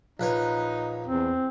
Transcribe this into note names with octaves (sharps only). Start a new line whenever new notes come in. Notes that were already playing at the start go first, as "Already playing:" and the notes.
A#1 D#4 B4 C#5
E2 C4